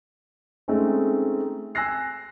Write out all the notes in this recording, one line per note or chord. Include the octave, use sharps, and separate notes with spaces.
G#3 A3 C4 C#4 D#4
G#5 E6 F#6 A#6 C7